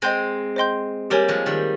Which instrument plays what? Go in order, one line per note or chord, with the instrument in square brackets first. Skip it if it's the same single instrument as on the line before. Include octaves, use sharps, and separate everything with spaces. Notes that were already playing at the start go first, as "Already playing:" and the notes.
[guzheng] G#3 C4 [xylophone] C5 D#5 G5 C6 G6
[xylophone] C5 D#5 G5 C6 G6
[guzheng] G3 A#3 [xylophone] G4 A#4 C#5 G#5
[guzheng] F3 G#3
D#3 G3